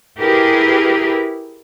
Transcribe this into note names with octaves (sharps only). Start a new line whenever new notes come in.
E4 G4 G#4 A#4 B4